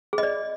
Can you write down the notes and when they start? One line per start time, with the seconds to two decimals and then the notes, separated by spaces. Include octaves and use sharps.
0.13 G#4
0.18 D#5
0.23 D5